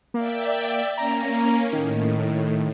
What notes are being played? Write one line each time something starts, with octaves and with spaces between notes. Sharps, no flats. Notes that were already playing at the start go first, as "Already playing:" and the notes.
A#3 D5 E5 G5
A#3 C#4 A#5
A2 D#3